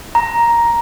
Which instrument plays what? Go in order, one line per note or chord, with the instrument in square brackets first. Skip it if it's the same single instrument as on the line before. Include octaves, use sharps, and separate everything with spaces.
[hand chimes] A#5